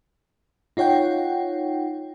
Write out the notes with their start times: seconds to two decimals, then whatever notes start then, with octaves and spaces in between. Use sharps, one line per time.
0.77 D#4 F4 C#5 F#5 G5